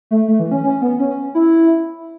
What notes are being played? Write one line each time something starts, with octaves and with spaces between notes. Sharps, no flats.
A3
A3
E3
C#4
C#4
B3
C#4
E4